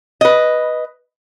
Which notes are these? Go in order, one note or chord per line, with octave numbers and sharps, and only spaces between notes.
B4 D#5